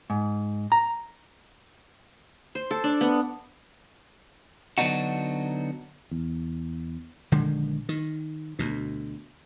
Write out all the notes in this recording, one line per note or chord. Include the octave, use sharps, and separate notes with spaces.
G#2
A#5
C5
A4
D4
B3
D3 F#3 B3 D4 D#4 F#4
E2
A#1 D3 D#3 G#3
D#3
D2 B2